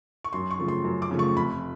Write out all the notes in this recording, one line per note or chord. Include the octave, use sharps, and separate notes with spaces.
C#6
F#2 C6
C#6
C#3 F3 A3
C6
F#2
D6
C#3 F3 A3
C#6
F1 B5